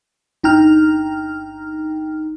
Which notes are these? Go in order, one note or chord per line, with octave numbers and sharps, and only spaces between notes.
G1 D#4 G5 A#5 F6